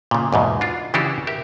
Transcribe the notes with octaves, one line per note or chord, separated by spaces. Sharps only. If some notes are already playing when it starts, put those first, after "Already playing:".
A#2 C#3
E2 G#2 B2
D4 F4
C#3 E3 D4 E4 F#4 G4
G4 A#4 E5